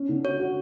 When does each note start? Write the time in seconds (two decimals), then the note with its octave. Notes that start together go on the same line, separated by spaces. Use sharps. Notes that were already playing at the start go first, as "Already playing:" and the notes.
Already playing: C#4
0.09 D3
0.24 F#4 C#5
0.39 F#4